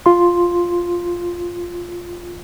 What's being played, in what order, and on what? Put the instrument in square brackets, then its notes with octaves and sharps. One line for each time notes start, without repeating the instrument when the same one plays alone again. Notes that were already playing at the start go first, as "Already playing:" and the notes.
[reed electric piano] F4 C6